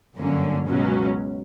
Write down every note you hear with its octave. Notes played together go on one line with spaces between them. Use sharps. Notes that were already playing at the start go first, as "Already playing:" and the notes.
G1 F#2 D3 A#3 C#4
C#2 B2 F#3 C#4